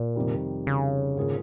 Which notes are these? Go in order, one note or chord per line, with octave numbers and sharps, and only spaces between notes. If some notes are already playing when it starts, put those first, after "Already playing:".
Already playing: A#2
F2 C3 D#3 G3
C#3
G#2 D#3 A#3 F4 G#4